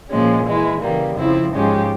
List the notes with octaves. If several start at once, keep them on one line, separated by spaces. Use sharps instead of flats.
A#2 F3 G#3 C#4
E3 G#3 E4
C#3 E3 G3 A#3
F2 C#3 F3 C4 E4
G#2 F3 G#3 C#4 G4